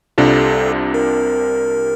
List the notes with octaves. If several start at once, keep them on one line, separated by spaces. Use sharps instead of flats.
C2 C3 G3 D4 F4 A4
A#4